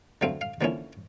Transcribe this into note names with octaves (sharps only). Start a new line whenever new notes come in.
D3 F#3 A3 C4 F5
F5
D3 F3 A#3 C#4 E4